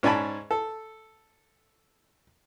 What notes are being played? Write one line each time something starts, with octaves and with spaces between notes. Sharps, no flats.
G#2 C#4 D5 G#5 A5 B5
A4